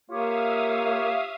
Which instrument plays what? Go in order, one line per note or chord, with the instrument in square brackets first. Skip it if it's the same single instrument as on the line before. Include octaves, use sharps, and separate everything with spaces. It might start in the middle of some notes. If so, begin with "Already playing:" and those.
[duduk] A#3 [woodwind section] F4 G4 C#5 [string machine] E5 F5 D#6